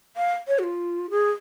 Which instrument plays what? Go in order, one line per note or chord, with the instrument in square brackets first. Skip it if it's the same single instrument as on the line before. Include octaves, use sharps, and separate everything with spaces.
[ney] F5
C#5
F#4
F4
G#4